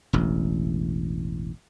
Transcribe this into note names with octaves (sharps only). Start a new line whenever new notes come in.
E1 A1